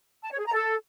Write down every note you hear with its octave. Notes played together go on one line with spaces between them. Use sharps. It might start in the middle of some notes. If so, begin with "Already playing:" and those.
A5
C#5
G#4
A#5
A4